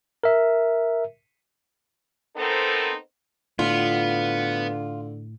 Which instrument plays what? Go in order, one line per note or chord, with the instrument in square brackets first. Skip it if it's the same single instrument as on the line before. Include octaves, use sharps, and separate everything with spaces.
[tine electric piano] A#4 E5
[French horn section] B3 C4 D#4 A4 A#4 C5
[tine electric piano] A2 [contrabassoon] D3 [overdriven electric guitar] B3 [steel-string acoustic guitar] F4